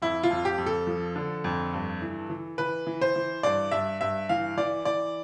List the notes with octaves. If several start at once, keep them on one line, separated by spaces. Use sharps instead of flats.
F2 E4
F4
F2
G4
F2
A4
F3
D3
F2
G2
E3
E3
E3 B4
E3
C5
E3
G2 D5
G2 E5
G2 E5
E3 F5
E3 D5
E3 D5